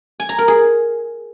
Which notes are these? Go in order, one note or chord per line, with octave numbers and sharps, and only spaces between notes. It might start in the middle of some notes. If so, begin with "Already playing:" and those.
G#5
A#5
A#4
G#4